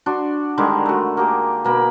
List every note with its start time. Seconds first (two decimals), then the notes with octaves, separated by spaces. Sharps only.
0.06 D4 F#4 C6
0.58 D3 D#3 G3 G#3
0.85 A3 F#4
1.17 A#3 G4 G#4
1.65 B2 A#3 B5